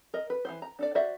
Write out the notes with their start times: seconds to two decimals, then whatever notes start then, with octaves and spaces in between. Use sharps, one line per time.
0.14 A#4 D#5
0.30 B4
0.45 E3 F#3 C5
0.62 A#5
0.79 D4 A4 D5
0.95 F#4 C5 D5 E5